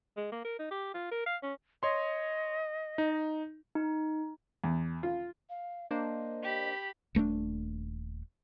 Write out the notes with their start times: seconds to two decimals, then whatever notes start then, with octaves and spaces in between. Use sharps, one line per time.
0.17 G#3
0.32 A#3
0.45 A#4
0.59 D#4
0.71 G4
0.94 F4
1.11 A#4
1.26 F5
1.43 C#4
1.83 C#5 D#5 C6
2.98 D#4
3.75 D#4
4.64 E2
5.03 F4
5.50 F5
5.91 A#3 D4 C5 D#5
6.43 G4 B5
7.15 D#1 A3 B3 D4